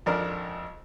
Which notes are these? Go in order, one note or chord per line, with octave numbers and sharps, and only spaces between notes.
G#1 F2 D4 A#4